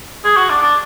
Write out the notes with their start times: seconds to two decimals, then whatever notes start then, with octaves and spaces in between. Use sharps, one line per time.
0.25 G#4
0.37 F#4
0.49 D4
0.62 D4